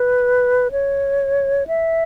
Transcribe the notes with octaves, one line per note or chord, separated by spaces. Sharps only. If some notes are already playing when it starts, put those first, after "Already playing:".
Already playing: B4
C#5
E5